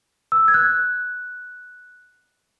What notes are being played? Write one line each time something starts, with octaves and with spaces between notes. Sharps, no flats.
E6
G#6
F#6